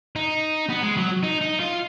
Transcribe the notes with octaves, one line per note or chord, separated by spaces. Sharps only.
D#4
B3
G#3
F#3
D#4
D#4
F4